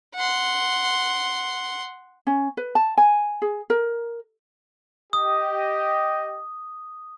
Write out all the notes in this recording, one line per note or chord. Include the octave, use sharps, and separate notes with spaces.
F#5 C6
C#4
B4
A5
G#5
G#4
A#4
G4 D#5 D#6